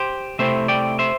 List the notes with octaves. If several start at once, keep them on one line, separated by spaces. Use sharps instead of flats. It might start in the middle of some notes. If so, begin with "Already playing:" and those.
Already playing: G4 C5
C3 A3 C4 E4 C5 E5
D5 G5
C5 E5